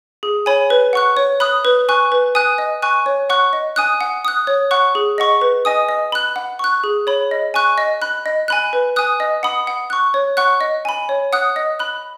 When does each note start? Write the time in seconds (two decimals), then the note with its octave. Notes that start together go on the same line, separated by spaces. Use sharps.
0.23 G#4
0.46 C#5 G#5 B5
0.70 B4
0.93 F#5 C#6 F#6
1.17 C#5
1.40 B5 D#6 F#6
1.65 B4
1.89 G#5 C#6 F#6
2.12 B4
2.35 G#5 D#6 F#6
2.58 D#5
2.82 G#5 C#6 F#6
3.06 C#5
3.30 F#5 C#6 F#6
3.53 D#5
3.76 G#5 D#6 F#6
4.01 F#5
4.25 D#6 F#6
4.47 C#5
4.71 F#5 C#6 F#6
4.95 G#4
5.18 D#5 F#5 C#6
5.41 B4
5.65 D#5 G#5 D#6
5.89 D#5
6.12 B5 F#6
6.36 F#5
6.59 C#6 F#6
6.84 G#4
7.07 C#5 B5
7.31 D#5
7.54 G#5 C#6 F#6
7.78 D#5
8.02 B5 F#6
8.26 D#5
8.48 G#5 B5 F#6
8.73 B4
8.96 G#5 D#6 F#6
9.20 D#5
9.43 F#5 B5 D#6
9.67 F#5
9.90 C#6 F#6
10.14 C#5
10.37 F#5 C#6 F#6
10.61 D#5
10.85 G#5 B5
11.09 C#5
11.33 F#5 D#6 F#6
11.56 D#5
11.79 B5 F#6